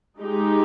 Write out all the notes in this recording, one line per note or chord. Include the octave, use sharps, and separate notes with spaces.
G#3 D#4 G4